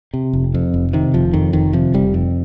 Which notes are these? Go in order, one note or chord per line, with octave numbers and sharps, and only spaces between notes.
C3
F1
F2
F1
C3 D#3
F1 F3
F2 D#3
F1 D#3
C3 F3
F1 G3
F2